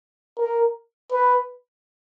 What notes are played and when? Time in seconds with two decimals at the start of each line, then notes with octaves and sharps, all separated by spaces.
0.38 A#4
1.12 B4